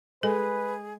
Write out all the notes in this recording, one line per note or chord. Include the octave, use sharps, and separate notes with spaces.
G#3 G#4 A4 B4